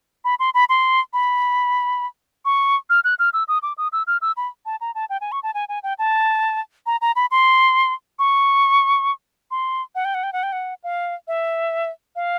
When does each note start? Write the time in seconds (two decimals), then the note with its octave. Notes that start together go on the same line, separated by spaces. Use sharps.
0.25 B5
0.40 C6
0.54 B5
0.69 C6
1.13 B5
2.45 C#6
2.90 F6
3.04 F#6
3.19 F6
3.33 E6
3.48 D#6
3.63 D6
3.78 D#6
3.93 E6
4.07 F6
4.22 E6
4.37 B5
4.66 A5
4.81 A#5
4.95 A5
5.10 G5
5.21 G#5
5.32 C#6
5.43 A5
5.54 G#5
5.69 G#5
5.83 G5
5.99 A5
6.86 A#5
7.01 A#5
7.16 B5
7.31 C6
8.19 C#6
9.51 C6
9.95 F#5
10.05 G5
10.14 F#5
10.23 G5
10.33 F#5
10.43 G5
10.52 F#5
10.84 F5
11.28 E5
12.16 F5